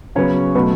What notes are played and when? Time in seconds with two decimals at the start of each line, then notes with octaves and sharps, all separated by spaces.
0.15 C#3 F#3 B3 C#4 C#5
0.55 B2 F#3 A3 B3 B4